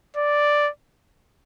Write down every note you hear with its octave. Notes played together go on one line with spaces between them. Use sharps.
D5